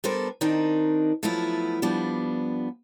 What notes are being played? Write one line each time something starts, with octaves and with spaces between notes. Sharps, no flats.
G3 B3 D4 A4 A#4 C5
D#3 C4 D4 D#4 A#4
F3 F#3 A3 B3 E4 F4
F3 G3 B3 D4